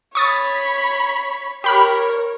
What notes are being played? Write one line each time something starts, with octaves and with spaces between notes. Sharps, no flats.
C#5 B5 C#6 D#6 A6
G4 A#4 C#5 B5 F6